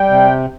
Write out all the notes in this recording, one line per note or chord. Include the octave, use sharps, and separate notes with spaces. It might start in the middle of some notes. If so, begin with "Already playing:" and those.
Already playing: G3 G5
C3